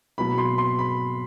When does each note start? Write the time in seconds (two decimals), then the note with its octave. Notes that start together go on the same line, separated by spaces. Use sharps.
0.18 B2 F#3 A#3 B5
0.38 C6
0.58 C6
0.79 B5